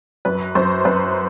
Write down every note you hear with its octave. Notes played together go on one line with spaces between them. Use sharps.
F#2 B4
F#2 C5
F#2 B4